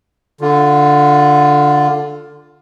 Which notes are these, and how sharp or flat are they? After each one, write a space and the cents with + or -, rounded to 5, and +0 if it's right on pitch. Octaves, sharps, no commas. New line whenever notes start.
D3 +0 F4 +10